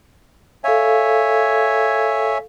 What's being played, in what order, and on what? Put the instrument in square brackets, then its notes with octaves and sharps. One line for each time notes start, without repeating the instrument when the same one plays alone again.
[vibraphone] A4 F5 [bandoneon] C#5 E5 G#5